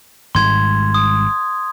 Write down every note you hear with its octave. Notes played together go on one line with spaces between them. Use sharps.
G#1 G#2 G3 C6 G#6
D#6